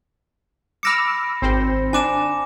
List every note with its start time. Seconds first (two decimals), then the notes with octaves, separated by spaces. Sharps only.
0.83 B5 D6 E6 F6 A#6 C#7
1.42 G#1 C4 C5
1.93 D4 G#5 D6 E7